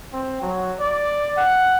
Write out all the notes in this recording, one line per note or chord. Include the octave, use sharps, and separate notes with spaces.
C4
F#3
D5
F#5